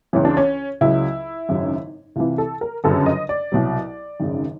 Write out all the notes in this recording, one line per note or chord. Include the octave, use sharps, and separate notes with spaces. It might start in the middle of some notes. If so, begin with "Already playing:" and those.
C#2 C#3 E3 C#4
D4
C#4
C#2 C#3 F#3 E4
G#1 F#2 C#3 F#3
C2 C3 E3 F4
A4
A#4
G1 F#2 C#3 F#3 A4
D#5
D5
C2 B2 F#3
G#1 F#2 C#3